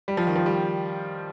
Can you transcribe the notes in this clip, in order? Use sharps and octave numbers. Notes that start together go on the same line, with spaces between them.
G3
F3
D#3
F3
G3